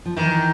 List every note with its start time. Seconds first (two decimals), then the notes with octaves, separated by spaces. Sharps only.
0.05 F3
0.16 D#3 E3